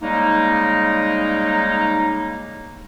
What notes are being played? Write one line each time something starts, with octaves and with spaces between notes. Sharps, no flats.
C#3 G3 G#3 A#3 D#4